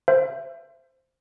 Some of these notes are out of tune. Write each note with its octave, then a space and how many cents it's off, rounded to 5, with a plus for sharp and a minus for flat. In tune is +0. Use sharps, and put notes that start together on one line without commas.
C5 +0 E5 +30